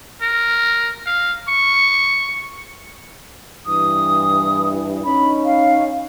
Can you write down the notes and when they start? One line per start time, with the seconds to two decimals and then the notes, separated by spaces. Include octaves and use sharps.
0.22 A#4
1.07 F5
1.48 C#6
3.66 G2 E3 D#6
5.04 C#4 D#4 B5
5.45 F5